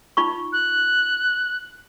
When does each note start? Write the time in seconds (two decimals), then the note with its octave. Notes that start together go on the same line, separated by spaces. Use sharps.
0.17 D#4 F4 C#6
0.53 F#6